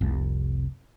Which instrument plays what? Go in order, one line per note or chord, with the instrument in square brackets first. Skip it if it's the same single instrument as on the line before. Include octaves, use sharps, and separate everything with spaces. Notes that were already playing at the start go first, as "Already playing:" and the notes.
[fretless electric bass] F1 C2